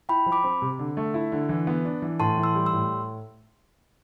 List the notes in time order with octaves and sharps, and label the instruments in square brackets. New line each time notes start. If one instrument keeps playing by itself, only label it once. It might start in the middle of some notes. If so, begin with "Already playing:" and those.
[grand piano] E4 [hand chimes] G5 B5
[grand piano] F3
[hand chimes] B5 D6
[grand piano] C4
C3
D3
A3
E4
D3
E3
B3
D4
E3
[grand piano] A2 [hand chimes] A5 C6
[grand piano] E3
[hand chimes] C6 E6
[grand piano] G3
[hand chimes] C6 E6
[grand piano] A2